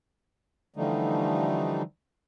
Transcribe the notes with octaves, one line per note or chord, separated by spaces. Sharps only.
D3 E3 F3 G3 A3 D#4